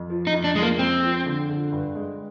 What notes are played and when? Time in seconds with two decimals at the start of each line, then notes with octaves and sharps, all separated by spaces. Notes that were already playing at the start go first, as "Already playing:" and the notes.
Already playing: F2
0.10 F3
0.27 D#4
0.32 F2
0.44 D4
0.56 F2 G#3
0.62 A#3
0.79 F2 C4
1.03 F3
1.26 D3
1.49 D3
1.72 G2
1.95 G#3